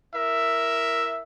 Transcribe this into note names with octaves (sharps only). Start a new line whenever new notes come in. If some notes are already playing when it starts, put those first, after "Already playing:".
E4 A#4 E5